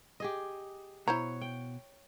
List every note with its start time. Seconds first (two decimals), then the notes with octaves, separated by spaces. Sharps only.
0.20 G4 G#4 D#5
1.08 B2 E4 C5 C#5 A#5
1.41 G5